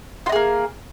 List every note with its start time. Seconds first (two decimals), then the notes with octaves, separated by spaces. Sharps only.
0.26 F4
0.29 D#4
0.32 G#4
0.35 A#3